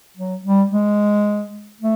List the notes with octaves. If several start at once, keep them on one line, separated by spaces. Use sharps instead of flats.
F#3
G3
G#3
A3